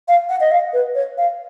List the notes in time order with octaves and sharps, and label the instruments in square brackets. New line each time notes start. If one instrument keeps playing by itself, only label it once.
[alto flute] F5
F#5
D#5
F5
B4
C#5
F5